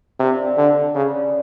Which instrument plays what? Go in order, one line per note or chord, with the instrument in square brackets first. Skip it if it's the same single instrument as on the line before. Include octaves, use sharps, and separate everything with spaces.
[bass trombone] C3 [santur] D4 F4 A#4
[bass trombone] D3
[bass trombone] C#3 [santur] D4 G4 B4 D5